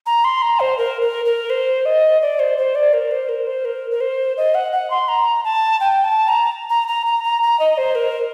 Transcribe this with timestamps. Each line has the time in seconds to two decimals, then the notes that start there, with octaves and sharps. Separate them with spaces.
0.06 A#5
0.24 C6
0.42 A#5
0.60 C5
0.78 A#4
1.01 A#4
1.25 A#4
1.50 C5
1.85 D#5
2.22 D5
2.39 C5
2.58 C5
2.75 D5
2.93 A#4
3.11 C5
3.29 A#4
3.47 C5
3.65 A#4
3.91 A#4
4.01 C5
4.37 D#5
4.55 F#5
4.72 F#5
4.90 C6
5.09 A#5
5.44 A5
5.80 G5
6.04 A5
6.28 A#5
6.70 A#5
6.88 A#5
7.06 A#5
7.24 A#5
7.42 A#5
7.60 D#5
7.78 C5
7.95 A#4